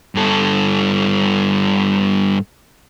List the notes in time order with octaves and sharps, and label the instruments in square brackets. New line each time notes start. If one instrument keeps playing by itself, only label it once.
[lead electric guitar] G2 A4